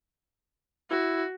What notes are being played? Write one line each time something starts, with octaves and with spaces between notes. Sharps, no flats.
E4 F#4